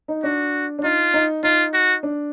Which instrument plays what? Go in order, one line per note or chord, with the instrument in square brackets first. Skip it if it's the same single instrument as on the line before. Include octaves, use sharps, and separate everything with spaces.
[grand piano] D#4
[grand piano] D4 [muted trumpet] F#4
[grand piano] D4
[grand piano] D#4 [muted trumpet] F4
[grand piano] D#4
[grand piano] D#4 [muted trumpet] F4
[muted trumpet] F#4
[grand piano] D4